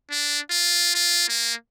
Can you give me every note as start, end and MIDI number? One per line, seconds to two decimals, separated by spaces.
0.11 0.40 62
0.51 0.91 65
0.95 1.28 65
1.29 1.54 58